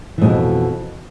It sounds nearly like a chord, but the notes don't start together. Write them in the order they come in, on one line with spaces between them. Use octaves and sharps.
E3 G#2 B2 F2